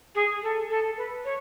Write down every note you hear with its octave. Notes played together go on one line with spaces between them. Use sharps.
G#4
A4
A4
B4
C#5